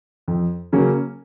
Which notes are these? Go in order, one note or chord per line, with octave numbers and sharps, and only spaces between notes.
F2
C#3 F#3 A#3 C#4